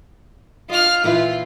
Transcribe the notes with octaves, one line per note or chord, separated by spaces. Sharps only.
F4 D#5 F6
A#2 E3 E4 F4 B4